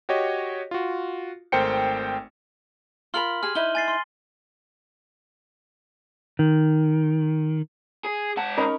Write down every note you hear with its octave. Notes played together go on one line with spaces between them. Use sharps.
F#4 G4 C#5 D#5
F4 F#4
G#1 A3 A#4 C5 G5 C#7
F4 A#4 B5 C6 F6 F#7
G4 G#4 F6
D#4 E4 B4 G7
G#5 A6 C7
C6
D#3
G#4
G#2 F#5 A5
C#4 D#4 A#4 A#5 B5